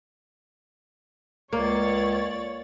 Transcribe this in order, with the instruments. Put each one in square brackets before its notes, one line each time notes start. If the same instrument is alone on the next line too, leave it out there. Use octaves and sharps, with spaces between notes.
[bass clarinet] C#2 [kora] A#3 [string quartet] C#5 D5 A6